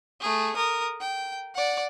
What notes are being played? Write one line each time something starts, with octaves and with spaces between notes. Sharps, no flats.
A3 G#4
A#4 D#6
G5
D5 F#5